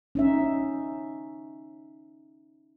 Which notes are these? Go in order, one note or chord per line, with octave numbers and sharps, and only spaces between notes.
C#4 D#4 E5